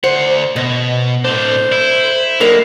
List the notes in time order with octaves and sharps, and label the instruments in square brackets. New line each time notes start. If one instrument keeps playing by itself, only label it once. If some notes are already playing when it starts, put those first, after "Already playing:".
[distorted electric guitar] D2 F#5 [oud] C5
[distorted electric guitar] B2 [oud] D#5
[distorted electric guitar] A2 D4 [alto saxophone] C5
[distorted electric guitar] E4
[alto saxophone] D3 [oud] F#3 D#4 A#4 [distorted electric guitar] A#3